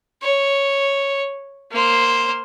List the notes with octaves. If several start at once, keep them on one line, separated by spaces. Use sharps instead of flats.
C#5
A#3 C5